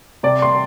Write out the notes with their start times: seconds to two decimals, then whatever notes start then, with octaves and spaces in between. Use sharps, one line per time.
0.23 C3 D5
0.42 C6